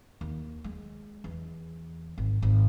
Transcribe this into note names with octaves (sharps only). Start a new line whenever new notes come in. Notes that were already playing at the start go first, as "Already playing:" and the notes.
D#2
G#3
E2
G#1
G#1